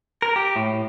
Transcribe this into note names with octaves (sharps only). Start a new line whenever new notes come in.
A#4
G4
A2